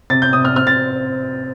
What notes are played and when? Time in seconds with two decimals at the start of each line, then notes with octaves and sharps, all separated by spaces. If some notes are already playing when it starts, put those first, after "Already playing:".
0.10 C3 A6
0.22 G6
0.33 C3 D#6
0.45 F6
0.56 C4 F6
0.67 A6